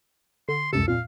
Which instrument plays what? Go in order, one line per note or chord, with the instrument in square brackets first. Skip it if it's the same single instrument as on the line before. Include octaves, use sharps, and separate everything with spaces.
[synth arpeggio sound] D3 [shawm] C6
[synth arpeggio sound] C#2 F#2 C3 [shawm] A4
[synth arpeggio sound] F2 A#2 [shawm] F5